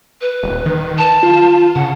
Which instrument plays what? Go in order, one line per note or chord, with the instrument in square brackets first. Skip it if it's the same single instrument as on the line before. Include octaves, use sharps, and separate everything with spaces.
[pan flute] B4
[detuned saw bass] D#1
D#3
[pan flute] A5
[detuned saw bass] F4
[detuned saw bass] C#3 [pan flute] F#5